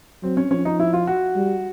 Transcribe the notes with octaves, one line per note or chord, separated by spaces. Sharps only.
F#3 C4
C#4
F3 C#4
D#4
E4
F4
F#4
G3